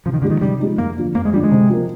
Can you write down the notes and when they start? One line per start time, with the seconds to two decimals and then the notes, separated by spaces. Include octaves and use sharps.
0.06 C3 F3
0.13 D#3
0.22 D3 F3 G#3 D#4
0.30 D#3
0.41 C3 G3
0.60 F3 G#3 D#4
0.78 F2 A#3
0.97 D3 F3
1.15 F2 A#3
1.25 G#3
1.33 D3 F3 G3
1.43 G#3
1.51 C3
1.70 F3 A#3